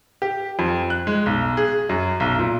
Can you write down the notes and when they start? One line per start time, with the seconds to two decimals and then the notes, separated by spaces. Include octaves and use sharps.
0.22 G4
0.59 F2
0.90 F#6
1.07 G#3
1.26 B1
1.57 G#4
1.89 F#2
2.20 B1
2.39 A#2